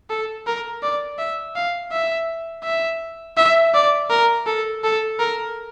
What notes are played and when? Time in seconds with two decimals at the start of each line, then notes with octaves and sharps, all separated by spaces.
0.10 A4
0.47 A#4
0.83 D5
1.19 E5
1.56 F5
1.92 E5
2.64 E5
3.37 E5
3.74 D5
4.10 A#4
4.47 A4
4.84 A4
5.20 A#4